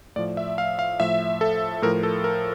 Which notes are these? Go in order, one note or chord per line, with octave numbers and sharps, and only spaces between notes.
A2 F3 D5
E5
F5
F5
A2 F3 E5
A4
A2 F3 A#4
A4
A#4